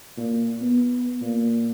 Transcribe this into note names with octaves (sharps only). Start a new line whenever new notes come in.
A#2
B3
A#2